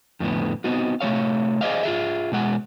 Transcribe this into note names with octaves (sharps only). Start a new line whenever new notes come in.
F2 A2 D3 B3
B3 C4 D#4 F#4
C3 A3 B3 C#5 F5
G#4 C5 D5 D#5 F5
F4 G#4 E5
B2 G#3 F#5